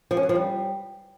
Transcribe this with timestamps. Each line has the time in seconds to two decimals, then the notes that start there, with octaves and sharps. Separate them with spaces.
0.11 F3
0.17 C#4
0.23 F#3
0.29 F3
0.35 G3